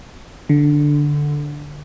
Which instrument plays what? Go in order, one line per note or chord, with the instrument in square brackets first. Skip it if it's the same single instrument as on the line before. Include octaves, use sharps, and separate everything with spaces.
[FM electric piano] D3